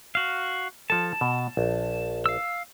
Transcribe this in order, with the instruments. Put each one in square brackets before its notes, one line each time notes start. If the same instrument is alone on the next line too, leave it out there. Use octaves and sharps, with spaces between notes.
[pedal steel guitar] F#4 F5
[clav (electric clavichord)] F3 A4 [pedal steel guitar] A5
[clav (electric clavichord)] B2
A#1
[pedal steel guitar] F5 E6